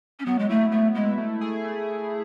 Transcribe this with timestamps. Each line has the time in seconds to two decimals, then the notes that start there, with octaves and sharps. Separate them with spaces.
0.19 C#4
0.26 F#3 B3
0.39 G#3
0.49 A3 E4
0.72 A3 B3
0.95 G#3 E4
1.18 A3
1.41 G#4
1.65 A3